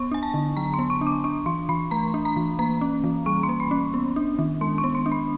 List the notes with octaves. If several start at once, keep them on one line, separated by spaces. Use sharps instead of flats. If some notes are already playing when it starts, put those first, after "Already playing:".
Already playing: B3 C#6
D4 G#5
A5
D3
F#3 A#5
C6
B3
C#6
D4
D6
D4 C#6
E3 C6
E3 B5
A3 A#5
D4
A#5
E3
A#3 A#5
C#4
E3
G3 C#6
C6
A#3
B5
C#4
B3
D4
D#3
G#3 C6
C#6
B3
C6
D4
B5